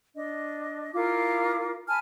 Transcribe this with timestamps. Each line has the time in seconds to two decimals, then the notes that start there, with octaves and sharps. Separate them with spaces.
0.14 D4 D#5
0.94 E4 F4 A#4 D6
1.88 G#5 A5 B5 F6